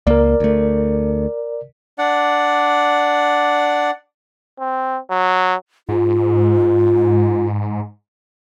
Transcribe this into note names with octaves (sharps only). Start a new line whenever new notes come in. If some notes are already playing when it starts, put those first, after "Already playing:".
C#2 A#3 A#4 D5
D2 A3
D4 D5 F#5
C4
F#3
G#2 F4